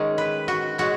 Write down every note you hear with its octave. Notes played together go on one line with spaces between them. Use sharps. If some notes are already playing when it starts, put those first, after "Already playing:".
Already playing: D#3 G#3 C#4
B4
F#4
B2 G#3 C#4 F#4